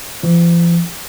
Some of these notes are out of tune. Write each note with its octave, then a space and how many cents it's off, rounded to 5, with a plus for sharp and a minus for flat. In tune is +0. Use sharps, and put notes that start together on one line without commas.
F3 -45